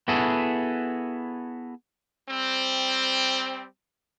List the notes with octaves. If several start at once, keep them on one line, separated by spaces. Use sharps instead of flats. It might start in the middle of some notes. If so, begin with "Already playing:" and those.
B3 E4 F#4 G#4 A4
G3 C4